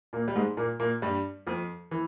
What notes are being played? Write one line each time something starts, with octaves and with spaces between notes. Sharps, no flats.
A#2 A#3
G3
G#2 G#3
A#2 A#3
A#2 A#3
G2 G3
F2 F3
E3